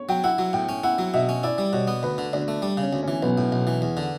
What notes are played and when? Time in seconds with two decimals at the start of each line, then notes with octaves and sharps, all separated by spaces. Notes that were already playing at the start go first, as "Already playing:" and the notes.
Already playing: C#5
0.09 F#3 G5
0.24 E4 F#5
0.38 F#3
0.53 A2 G5
0.69 C#4
0.83 E4 F#5
0.98 F#3
1.14 B2 E5
1.29 C#4
1.43 E4 D5
1.58 G3
1.73 B2 C#5
1.88 B3
2.03 D2 B4
2.18 D3
2.33 D2 D4
2.48 A3
2.62 G3
2.77 C#3
2.83 C#4
2.93 D2
3.03 E3 C#4
3.23 B1 B3
3.38 A2
3.52 B1
3.67 E3
3.82 E2
3.97 D3